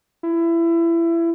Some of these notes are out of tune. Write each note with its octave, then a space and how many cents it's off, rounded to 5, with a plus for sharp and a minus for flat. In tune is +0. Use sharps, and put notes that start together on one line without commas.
E4 +25